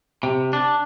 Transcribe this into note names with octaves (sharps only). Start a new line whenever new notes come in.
C3
D4